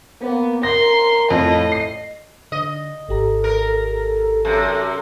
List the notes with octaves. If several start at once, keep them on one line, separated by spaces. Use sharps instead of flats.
A#3 B3
A#4 C6 A#6
F2 A2 D#5
C7
D3 D#5
G#1 G4 A4 A#5
A#4
A4
F#2 C3